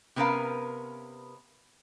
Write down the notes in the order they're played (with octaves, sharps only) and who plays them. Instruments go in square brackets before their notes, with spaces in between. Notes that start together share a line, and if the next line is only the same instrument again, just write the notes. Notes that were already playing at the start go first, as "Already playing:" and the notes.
[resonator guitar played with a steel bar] C3 B3 C#4 A#4 B4 F5